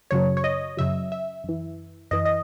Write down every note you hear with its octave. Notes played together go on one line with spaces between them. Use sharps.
F#2 C#3 F#3 C#5
C#5
D#5
F#2 C#3 F#3 E5
E5
F#2 E3
F#2 E3 D#5
D#5